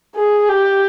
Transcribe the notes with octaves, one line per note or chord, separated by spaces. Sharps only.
G#4
G4